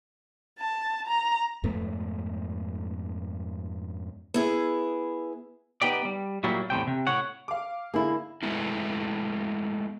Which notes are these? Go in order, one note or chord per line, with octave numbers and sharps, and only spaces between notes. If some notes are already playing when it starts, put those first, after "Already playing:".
A5
A#5
F2 G#2 A3 B3
B3 E4 G#4
B3 D#4 G4 D5
G3
A#2 F#3 G3 A#3 E4
E2 A2 C3 G5
C3
A2 C#5 F#5
F5 D6
D3 A#3 E4 G#4
G#3 A3 B3 E4